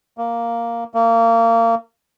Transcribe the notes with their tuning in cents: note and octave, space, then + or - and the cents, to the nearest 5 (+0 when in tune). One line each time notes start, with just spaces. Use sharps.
A#3 +0
A#3 -25